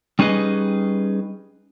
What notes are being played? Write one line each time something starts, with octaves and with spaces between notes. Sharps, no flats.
G3 C#4 D#4 G#4 B4 D#5